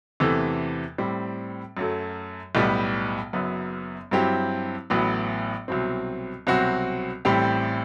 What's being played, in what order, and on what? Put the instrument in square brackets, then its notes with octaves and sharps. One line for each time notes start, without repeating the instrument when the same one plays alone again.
[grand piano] E2 C3 E3 A3
A2 G3 C4
F#2 F#3 A3
B1 A2 G3 B3
F#1 F#2 F#3 B3
G2 F#3 C4 E4 G4
A1 A2 F#3 B3
C2 B2 F#3 C4
C2 B2 F#3 C4 F#4
A1 A2 G3 C4 G4